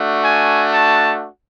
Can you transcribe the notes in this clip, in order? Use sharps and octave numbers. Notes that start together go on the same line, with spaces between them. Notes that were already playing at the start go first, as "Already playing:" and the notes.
Already playing: A3 D4 F#4
G#5
A5